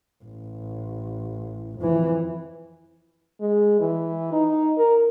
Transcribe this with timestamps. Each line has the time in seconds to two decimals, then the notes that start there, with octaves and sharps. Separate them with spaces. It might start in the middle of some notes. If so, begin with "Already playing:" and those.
0.24 A1
1.79 F2 E3
3.40 G#3
3.80 E3
4.32 D#4
4.78 A#4